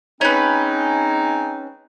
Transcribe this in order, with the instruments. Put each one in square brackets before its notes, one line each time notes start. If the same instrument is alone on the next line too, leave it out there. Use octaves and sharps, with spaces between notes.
[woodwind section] G#3 C4 D#4 [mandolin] C#4 B4